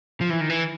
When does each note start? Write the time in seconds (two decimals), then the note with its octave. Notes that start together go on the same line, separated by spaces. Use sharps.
0.21 F3
0.30 E3
0.41 D#3
0.50 E3